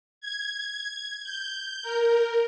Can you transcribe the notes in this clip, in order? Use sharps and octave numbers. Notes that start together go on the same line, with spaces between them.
G#6
G6
A#4